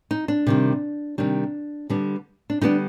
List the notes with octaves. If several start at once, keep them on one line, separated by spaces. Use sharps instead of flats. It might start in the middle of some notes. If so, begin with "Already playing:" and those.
D#4
D4
C3 D#3 G3
C3 D#3 G3 D4
D3 G3 B3 D4
D4
D3 G3 B3 D4 D#4